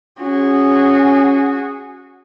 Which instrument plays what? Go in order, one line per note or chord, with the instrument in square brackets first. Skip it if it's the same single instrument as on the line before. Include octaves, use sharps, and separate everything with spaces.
[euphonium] C#4 [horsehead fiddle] F#4 G#4